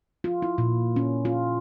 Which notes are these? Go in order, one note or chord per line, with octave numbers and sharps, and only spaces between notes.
F4
E4
A#2
C#4
F4